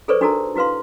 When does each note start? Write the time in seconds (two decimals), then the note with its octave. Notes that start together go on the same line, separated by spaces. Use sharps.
0.08 G#4 A4 B4 C5 D5 C#6
0.21 D4 D#4 F#4 A4 A#4 A#5
0.56 E4 F#4 B4 F5 C6